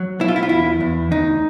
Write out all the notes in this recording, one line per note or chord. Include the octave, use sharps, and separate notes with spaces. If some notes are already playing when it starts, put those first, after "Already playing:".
Already playing: F#3
B2 E4
F4
E4
F4
E2 E4
E2
D2 D#4